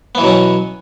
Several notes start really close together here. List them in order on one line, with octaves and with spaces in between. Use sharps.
B3 E3 B2 F#3 C#4